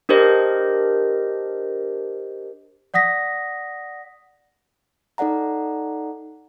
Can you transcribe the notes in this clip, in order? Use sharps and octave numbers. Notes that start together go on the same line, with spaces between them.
D4 G4 A#4 C5 D#5
D5 F#5 D#6 A#6 B6
D#4 A4 D5 F#5 A#5